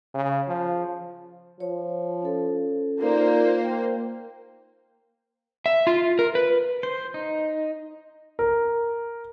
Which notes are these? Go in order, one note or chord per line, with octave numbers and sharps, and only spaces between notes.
C#3
F3
F3 C#5
C#4 A4
A#3 D#4 F4 C5 D5
G5
E5
F4
A#4
B4
C5
D#4
A#4